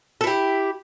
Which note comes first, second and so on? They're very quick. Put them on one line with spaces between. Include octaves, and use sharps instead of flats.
A4 E4 G4